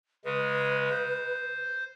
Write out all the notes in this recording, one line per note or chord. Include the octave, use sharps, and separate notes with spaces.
C#3 G#3 B4
C5